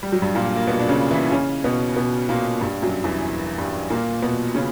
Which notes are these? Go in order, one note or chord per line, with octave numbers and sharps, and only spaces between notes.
G3
F#3
G2 G3
A#2 A#3
A#3
B2 B3
D4
C#3 C#4
E3 E4
C#3 C#4
B2 B3
B2 B3
A#2 A#3
G2 G3
F#2 F#3
E2 E3
G2 G3
A#2 A#3
B2 B3
C#3 C#4